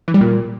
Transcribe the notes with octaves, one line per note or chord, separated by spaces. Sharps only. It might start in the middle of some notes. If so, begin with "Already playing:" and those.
E3
G3
A#2